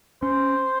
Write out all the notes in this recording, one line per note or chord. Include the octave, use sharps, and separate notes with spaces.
C#4 C5